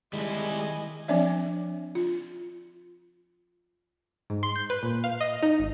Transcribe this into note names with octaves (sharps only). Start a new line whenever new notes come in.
D#3 G3 G#3 E4 D#5 G#5 A5
F3 C4 D4 D5 E5
F4
G#2
C6
G6
B4
A#2
F5
D#5
D#4
G#1